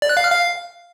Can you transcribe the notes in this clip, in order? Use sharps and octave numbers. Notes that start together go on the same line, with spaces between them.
D5
F#6
F5
F6
F5